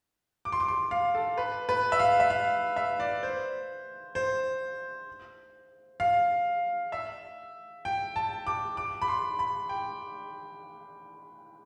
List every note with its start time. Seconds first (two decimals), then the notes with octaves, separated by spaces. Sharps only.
0.45 D6
0.52 C6
0.60 D6
0.68 C6
0.91 F5
1.15 A4
1.38 B4
1.69 B4
1.92 E5
1.99 F5
2.20 E5
2.30 F5
2.76 E5
3.00 D5
3.23 C5
4.15 C5
6.00 F5
6.92 E5
7.85 G5
8.16 A5
8.47 D6
8.77 D6
9.02 B5
9.08 C6
9.39 B5
9.69 G5